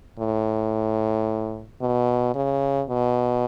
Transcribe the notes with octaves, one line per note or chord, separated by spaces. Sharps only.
A2
B2
C#3
B2